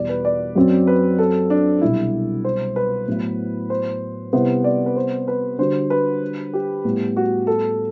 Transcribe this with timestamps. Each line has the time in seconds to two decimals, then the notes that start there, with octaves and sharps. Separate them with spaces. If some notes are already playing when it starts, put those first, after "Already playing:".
Already playing: E2 B2 G3 B3 D5
0.09 B4
0.25 D5
0.55 F#2 F#3 C4
0.87 B4
1.19 A4
1.50 D4
1.81 C2 B2 F#3 E4
2.45 C5
2.76 B4
3.08 A2 F#3 B3 E4
3.70 C5
4.33 C3 G3 B3 E4 C5
4.64 D5
4.86 B4
4.96 C5
5.28 B4
5.58 D3 G3 D4 F#4 C5
5.90 B4
6.53 G4
6.85 A2 G3 B3
7.17 F#4
7.47 A4